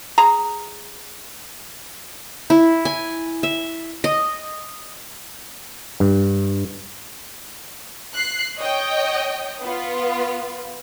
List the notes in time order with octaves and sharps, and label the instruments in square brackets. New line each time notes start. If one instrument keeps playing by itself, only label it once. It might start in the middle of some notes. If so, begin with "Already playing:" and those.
[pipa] G#4 A#5
[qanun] E4
G#5
E5
D#5
[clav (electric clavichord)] G2
[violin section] F#6 C7
C#5 D#5 G5
B3 F4